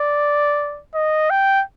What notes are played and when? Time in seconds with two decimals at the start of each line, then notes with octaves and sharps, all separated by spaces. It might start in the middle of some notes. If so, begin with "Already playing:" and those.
Already playing: D5
0.95 D#5
1.30 G5